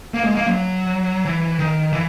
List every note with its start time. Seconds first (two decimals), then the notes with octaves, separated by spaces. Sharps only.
0.14 A#3
0.24 G#3
0.35 A#3
0.47 F#3
1.25 E3
1.59 D#3
1.93 E3